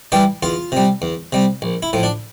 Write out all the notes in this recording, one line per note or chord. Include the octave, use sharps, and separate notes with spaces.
E3 G3 G4
E2 F4
C3 G3
E2
C3 G3
A#1
E4
A2 F3
D4